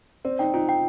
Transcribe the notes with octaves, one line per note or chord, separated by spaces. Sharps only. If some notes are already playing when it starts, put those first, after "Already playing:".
C4 D5
D#4 G5
D#4 F4
G5